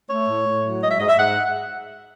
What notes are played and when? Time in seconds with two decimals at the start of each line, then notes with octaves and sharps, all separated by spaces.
0.09 A3 C#5
0.27 A2
0.45 A2
0.64 F#3
0.82 G#3 D#5
0.91 E5
0.99 G#2 D#5
1.09 E5
1.17 G#2 F#5